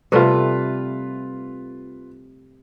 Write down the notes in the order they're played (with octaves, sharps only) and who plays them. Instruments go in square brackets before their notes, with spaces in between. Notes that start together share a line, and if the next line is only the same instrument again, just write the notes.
[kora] C3 G3 A3 [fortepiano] F4 B4